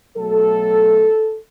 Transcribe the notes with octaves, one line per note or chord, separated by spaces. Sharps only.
B2 F#3 A3 A4